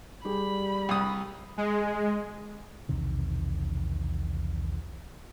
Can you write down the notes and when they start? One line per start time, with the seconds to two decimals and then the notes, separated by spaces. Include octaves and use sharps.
0.25 G3 G4 G#4 B5
0.89 C2 D#6
1.58 G#3
2.89 B1 E2 C3 D#3